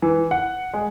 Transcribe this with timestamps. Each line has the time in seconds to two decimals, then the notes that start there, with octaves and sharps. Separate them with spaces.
0.02 E3
0.31 F#5
0.74 G#3